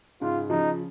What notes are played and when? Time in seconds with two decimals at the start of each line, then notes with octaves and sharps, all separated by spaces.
0.21 G#2 C#3 F4
0.50 C#3 F3 D#4